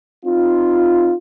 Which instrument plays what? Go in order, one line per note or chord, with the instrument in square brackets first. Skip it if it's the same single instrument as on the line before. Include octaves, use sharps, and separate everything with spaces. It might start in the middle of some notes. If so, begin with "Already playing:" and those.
[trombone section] C4 D#4 F4